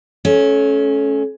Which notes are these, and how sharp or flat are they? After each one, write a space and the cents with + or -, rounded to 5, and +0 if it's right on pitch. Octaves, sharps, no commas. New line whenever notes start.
A3 -30 C#4 +0